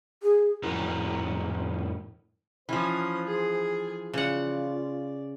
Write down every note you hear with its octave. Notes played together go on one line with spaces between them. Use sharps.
G#4
F2 A2 E4 F#4 A#4
E3 F3 C#4 C5 D#6
G#4
C#3 F4 D5 F#5